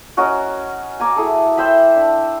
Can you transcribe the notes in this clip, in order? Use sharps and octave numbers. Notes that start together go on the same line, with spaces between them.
C#4 F#4 A#4 D#5
G#5 A#5 D6
E4 G#4 A4
C5 E5 G5 B5
D4